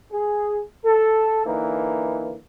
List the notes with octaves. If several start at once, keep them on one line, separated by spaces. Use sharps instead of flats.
G#4
A4
D3 E3 A#3 D#4